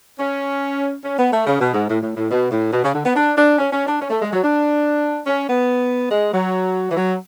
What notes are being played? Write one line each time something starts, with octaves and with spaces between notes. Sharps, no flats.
C#4
C#4
B3
A3
C#3
B2
G#2
A2
A2
A2
B2
A2
B2
C#3
D3
B3
D4
D4
C#4
C#4
D4
C#4
A3
G#3
F#3
D4
C#4
B3
G#3
F#3
E3
F#3